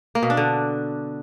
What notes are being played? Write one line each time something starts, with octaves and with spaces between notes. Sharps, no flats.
A#3
B2
D4
D3